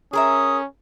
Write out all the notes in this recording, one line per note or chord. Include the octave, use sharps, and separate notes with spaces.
C#4 G#4 A#4 E5 D#6